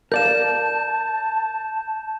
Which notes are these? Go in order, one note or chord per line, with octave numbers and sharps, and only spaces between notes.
A#4 D5 F5 A5 G6 E7